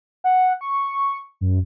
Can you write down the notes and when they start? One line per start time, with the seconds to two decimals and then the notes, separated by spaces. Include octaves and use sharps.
0.24 F#5
0.61 C#6
1.41 F#2